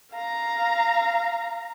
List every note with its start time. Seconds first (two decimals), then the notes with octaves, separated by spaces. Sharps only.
0.13 F5 A#5